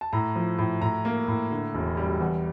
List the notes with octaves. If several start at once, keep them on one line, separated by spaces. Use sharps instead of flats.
A5
A2 A#5
F3
A2
A2 A#5
A#3
A2
D3
E1
G3
E2